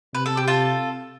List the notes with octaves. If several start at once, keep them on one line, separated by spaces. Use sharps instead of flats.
C3 B4
A4
G4
F4 A4